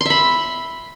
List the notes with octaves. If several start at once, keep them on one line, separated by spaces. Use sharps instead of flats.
E5 B5 C6